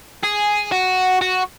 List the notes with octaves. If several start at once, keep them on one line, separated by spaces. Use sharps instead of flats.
G#4
F#4
F#4